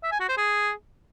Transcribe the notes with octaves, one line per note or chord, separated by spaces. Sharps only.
E5
G#5
F#4
C5
G#4